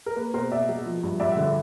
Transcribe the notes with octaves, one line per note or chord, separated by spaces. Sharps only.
A#4
A#3 B4
B2 A#4 C5
B2 D5 E5
F#3
F3
G2
G2 D5 E5
E5 F#5
D3
D5 E5